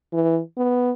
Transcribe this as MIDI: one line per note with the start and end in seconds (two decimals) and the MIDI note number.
0.13 0.40 52
0.57 0.92 59